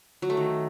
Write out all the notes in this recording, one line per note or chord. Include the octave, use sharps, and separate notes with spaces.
F#3
A3
D#3